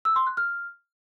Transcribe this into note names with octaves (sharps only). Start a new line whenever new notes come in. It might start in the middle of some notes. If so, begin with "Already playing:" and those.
E6
C6
F#6
F6